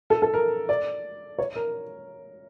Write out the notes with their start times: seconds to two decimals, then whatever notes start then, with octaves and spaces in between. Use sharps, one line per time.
0.10 A4
0.22 A4
0.34 A#4
0.69 D5
1.39 C#5
1.56 A#4